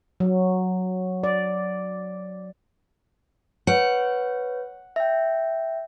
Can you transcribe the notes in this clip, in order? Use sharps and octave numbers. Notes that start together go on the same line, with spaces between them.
F#3
D5
B4 C#5 F#5
E5 G5